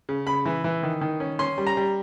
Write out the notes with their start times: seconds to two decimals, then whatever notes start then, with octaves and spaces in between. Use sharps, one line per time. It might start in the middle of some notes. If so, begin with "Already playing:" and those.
0.09 C#3
0.27 C#3 B5
0.46 E3
0.64 E3
0.83 D#3
1.01 D#3
1.20 C#4
1.39 C#4 C6
1.58 G3
1.67 A#5
1.77 G3